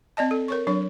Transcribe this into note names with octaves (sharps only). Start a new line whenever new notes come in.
C4 D5 D#5 A5
A4
A#4 C#5 C#6
F#3 D4 C#5